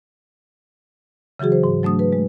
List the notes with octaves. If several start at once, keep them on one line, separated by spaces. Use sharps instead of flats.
C#3 E3 F#3 F#4 G#4
C5
G#2
F#3 A3 D4 D#6
B4
G#3